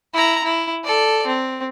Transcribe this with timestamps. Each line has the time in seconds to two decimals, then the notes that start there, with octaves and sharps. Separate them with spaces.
0.14 E4 A#5
0.44 E4
0.84 A4 D5
1.26 C4